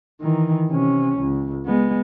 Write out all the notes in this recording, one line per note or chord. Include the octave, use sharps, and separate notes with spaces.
D#3 E3
C3 C#4
C#2
G#3 B3